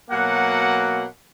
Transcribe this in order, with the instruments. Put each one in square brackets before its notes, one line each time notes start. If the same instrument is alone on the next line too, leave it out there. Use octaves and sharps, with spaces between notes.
[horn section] B2 F#3 A#3 F#5